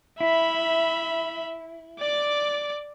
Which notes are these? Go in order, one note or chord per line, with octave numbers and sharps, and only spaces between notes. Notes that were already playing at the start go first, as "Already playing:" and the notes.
E4 E5 B5
D5 D6